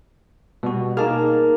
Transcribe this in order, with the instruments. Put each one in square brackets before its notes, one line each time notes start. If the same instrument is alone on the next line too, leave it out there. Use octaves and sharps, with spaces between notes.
[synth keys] B2 [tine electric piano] G3 F#4
[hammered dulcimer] A#3 [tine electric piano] D#4 A5 F6 [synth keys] G#4